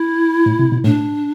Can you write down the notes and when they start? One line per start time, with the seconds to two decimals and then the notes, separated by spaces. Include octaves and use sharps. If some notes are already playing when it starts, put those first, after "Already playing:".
Already playing: E4
0.46 A2
0.59 C3
0.72 B2
0.84 A2 D4